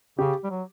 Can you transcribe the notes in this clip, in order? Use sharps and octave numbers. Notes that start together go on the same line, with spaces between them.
C#3 G4
G3
F#3